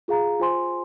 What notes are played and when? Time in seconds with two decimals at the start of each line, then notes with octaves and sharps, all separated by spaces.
0.08 F4 G#4 F5 A#5
0.40 F4 C5 G#5 C6